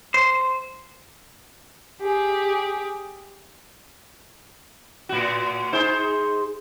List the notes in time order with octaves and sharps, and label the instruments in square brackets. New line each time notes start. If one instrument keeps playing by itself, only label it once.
[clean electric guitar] C5
[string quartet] G4 G#4
[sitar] A2 F#4
D#4 G#4 C5